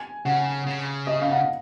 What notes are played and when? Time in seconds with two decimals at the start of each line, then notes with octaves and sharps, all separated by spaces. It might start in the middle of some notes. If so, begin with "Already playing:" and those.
Already playing: G#5
0.25 C#3 F#5
0.67 C#3
1.07 D#5
1.21 F5
1.31 F#5
1.36 F5